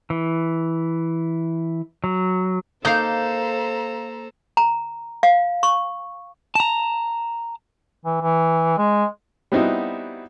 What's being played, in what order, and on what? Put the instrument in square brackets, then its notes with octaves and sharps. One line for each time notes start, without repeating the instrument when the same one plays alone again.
[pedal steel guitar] E3
F#3
[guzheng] A#3 D#4 [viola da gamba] A4 [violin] C5 A#5 [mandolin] F5 G6
[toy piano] A#5
F5
C#6
[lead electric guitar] A5 A#5
[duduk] E3
E3
G#3
[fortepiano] G3 B3 C4 D#4 E4 F#4